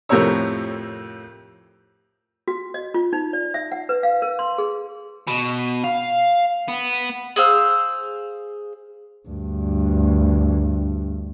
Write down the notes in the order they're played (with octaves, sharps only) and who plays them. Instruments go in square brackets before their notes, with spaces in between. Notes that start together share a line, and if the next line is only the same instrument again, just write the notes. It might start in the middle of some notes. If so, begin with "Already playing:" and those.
[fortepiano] F2 A2 C3 A#4 C#5 E6
[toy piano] F#4
D#5
F4
D#4
D5
E5
F#5
B4
F5
A#4
C6
G#4
[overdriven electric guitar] B2
F5
B3
[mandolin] G#4 C5 F5 E6
[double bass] D2 G2